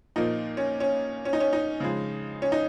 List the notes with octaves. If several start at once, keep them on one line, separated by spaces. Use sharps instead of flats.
A#2 F3 A#3 D#4
C#4
C#4
C#4
D#4
C#4
D#4
C#3 F3 G#3
C#4
D#4